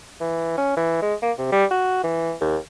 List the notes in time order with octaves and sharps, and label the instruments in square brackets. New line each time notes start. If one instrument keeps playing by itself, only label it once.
[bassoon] E3
C#4
E3
G#3
A#3
C3
G3
F#4
E3
D#2